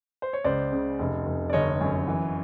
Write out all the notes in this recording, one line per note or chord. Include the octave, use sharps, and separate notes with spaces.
C5
C#5
C#2 C5 D5
C#3
F1
F1
D5
G1 C#5 D#5
F#2
E3